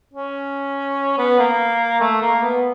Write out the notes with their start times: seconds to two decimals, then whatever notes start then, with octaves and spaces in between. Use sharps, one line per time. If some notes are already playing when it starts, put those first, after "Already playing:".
0.14 C#4
1.18 B3
1.39 A#3
2.01 A3
2.22 A#3
2.42 B3